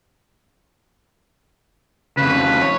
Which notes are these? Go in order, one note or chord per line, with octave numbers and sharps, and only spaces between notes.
F2 C#3 B4
C#5